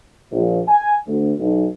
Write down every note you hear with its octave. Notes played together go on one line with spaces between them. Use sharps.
A#1
G#5
D2
B1